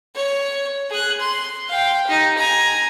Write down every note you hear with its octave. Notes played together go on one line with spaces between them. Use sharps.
C#5
G#4 F#6
C6
F5 G5
D#4 G4
G#5 A#5